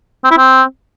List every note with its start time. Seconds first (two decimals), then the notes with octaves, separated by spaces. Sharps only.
0.24 C4
0.31 E4
0.38 C4